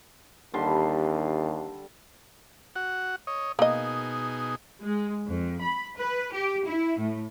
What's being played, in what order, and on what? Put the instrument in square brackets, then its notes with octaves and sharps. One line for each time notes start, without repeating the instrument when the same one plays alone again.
[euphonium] D#2 [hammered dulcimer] D3 G3 C6
[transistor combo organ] F#4 F#5
C#5 D#5
[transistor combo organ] B2 D#4 G#4 [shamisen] A#3 D#5
[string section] G#3
F2
B5
B4
G4
E4
A2